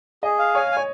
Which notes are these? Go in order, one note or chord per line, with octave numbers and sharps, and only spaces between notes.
G#4 D#5
F5
C#5 G#5
G#5
C#5